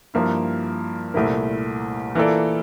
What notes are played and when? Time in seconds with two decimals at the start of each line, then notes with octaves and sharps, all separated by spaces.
0.14 G2 F3 A#3 E4
1.14 C2 A#2 A3 E4 A#4
2.15 E3 A#3 F4 A4 D5